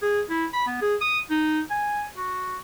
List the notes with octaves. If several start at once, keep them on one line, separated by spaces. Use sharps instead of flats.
G#4
E4
B5
B3
G#4
D#6
D#4
G#5
F#4